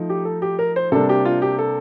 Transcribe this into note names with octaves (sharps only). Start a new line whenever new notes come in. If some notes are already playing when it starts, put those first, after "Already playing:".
Already playing: F3 A3 D#4
G4
A4
G4
A#4
C5
C3 G3 A#3 D4 A4
G4
F4
G4
A4